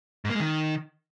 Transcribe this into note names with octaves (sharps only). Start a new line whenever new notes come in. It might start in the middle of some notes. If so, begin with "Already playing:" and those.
G#2
A#3
G#3
D#3